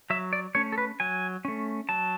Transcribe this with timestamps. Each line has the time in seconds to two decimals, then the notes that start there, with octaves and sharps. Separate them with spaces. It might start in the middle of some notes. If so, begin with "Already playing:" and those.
0.10 F#3 E5
0.33 D5
0.55 A3 C#4 C#5
0.72 A4
0.78 B4
1.00 F#3 G#5
1.45 A3 C#4
1.89 F#3 A5